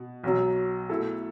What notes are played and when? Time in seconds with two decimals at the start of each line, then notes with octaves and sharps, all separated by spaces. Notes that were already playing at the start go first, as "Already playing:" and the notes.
Already playing: B2
0.24 B1 B2 F#3
0.89 B2 A3 E4 A4